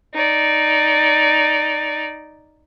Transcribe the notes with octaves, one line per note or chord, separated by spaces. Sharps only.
D#4 D5